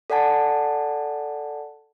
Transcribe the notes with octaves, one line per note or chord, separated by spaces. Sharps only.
A4 D5 F#5 G#5 A5